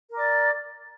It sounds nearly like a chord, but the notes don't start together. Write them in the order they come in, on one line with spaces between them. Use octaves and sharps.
A#4 D6 D5